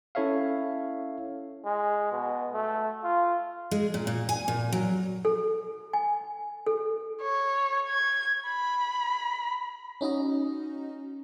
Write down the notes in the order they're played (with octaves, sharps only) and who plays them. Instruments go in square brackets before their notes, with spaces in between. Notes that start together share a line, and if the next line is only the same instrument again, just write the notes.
[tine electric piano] C#4 E4 A4 C#5 E5 F5
[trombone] G#3
B2
A3
F4
[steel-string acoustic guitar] G#3
A#2
A#2
G#5
A#2
F#3
[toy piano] A4
G#5
A4
[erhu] C#5
G#6
B5
[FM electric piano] C#4 D#4 F#4 D#5